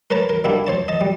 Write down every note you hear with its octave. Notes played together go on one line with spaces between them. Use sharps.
A#4 B4 C#5 A5 A#5
A#4
D3 G3 A#3 D4 E4
C5 C#5 A5
D#5 A5
G3